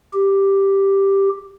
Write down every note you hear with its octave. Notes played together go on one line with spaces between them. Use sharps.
G4